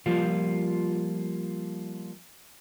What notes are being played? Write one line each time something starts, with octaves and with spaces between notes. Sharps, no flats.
F3 G3 A#3 F4